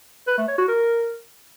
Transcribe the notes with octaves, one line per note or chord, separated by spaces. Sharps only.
B4
A3
C#5
F#4
A#4